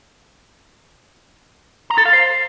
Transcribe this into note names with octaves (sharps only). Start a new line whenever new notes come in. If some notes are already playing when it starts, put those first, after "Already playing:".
A#5
A4
F5
C5